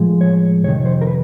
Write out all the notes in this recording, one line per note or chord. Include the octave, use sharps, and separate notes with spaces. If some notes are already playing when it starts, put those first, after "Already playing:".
Already playing: A2 F3 G#3
C#5
F2 C3 D#3 C#5
C5
A#4
B4